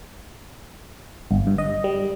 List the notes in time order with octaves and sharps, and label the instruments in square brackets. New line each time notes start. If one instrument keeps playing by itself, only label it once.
[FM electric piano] G1
G2
D#5
G3